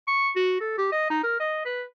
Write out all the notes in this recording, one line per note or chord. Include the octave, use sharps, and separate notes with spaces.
C#6
F#4
A4
G4
D#5
D#4
A#4
D#5
B4